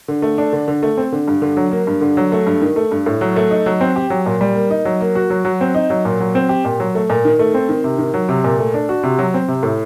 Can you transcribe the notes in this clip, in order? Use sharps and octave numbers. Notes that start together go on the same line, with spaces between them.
D3
A3
D4
D3
D3
A3
C4
D3
G2
D3
F#3
A#3
G2
D3
F#3
A3
G2
D#3
A3
G2
A2
F#3
A3
D#4
F#3
C4
G4
F#3
A#2
G3
A#3
D#4
F#3
A#3
F#4
F#3
F#3
C4
D#4
F#3
A#2
F#3
C4
G4
A#2
F#3
A3
A#2
D#3
A3
C4
D#3
C3
D#3
F#3
C3
A#2
A3
D4
F#4
C3
F#3
C4
C3
A2